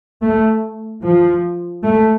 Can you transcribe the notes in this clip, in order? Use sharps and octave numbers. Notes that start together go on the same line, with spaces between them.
A3
F3
A3